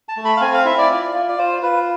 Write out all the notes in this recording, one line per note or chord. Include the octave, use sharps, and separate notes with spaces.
A5
A3
B5
F5
C4 G#5
F5
E4 E5
D5
F4
F4
D5
F4 C5
F4 B4